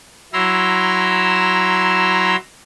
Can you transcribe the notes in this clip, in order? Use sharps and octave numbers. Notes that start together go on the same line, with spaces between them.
F#3 E4 A#5 C6 E6